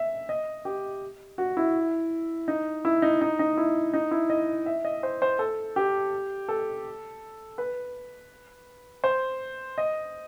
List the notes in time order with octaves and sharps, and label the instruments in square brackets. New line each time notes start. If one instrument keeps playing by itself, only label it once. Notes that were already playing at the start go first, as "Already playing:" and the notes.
Already playing: [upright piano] E5
D#5
G4
F#4
E4
D#4
E4
D#4
D#4
D#4
E4
D#4
E4
D#5
E5
D#5
C5
C5
A4
G4
A4
B4
C5
D#5